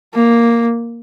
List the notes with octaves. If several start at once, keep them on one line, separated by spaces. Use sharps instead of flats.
A#3